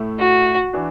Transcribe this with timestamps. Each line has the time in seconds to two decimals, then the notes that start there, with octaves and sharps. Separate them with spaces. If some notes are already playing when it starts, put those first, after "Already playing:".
Already playing: A2 A3 E4
0.18 F#4
0.73 E3 D4 F#4